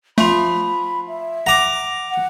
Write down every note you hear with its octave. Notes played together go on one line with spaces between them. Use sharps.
F3 A3 B5 C6 F7
E5
F#5 A#5 D6
F#5